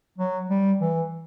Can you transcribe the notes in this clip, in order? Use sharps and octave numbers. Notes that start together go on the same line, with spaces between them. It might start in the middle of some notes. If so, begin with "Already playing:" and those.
F#3
G3
E3